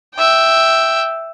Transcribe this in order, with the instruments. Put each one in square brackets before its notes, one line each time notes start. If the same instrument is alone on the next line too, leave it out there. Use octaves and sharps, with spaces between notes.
[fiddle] E5 G5